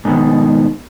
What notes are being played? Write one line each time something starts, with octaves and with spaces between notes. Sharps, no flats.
G#2 B2 D#3